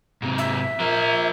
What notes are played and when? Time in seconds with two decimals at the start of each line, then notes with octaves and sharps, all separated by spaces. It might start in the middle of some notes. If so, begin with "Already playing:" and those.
0.22 G#2 C3
0.38 E5
0.80 F3 A#4